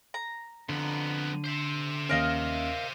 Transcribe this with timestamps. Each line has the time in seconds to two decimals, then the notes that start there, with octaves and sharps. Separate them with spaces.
0.14 A#5
0.69 F2 D3 B3
1.44 C5 E5
2.09 D#2 C#4 A#4 D#5 F5